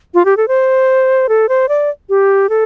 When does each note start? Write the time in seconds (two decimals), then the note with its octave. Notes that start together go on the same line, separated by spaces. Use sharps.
0.14 F4
0.25 G4
0.37 A4
0.48 C5
1.29 A4
1.49 C5
1.69 D5
2.09 G4
2.49 A4